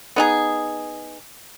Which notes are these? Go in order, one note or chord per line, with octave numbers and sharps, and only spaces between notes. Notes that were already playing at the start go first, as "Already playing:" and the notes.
B3 D#4 G#4